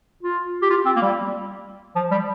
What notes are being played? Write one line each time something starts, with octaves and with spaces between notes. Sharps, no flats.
F4
G4
F4
C4
A#3
G3
F3
G3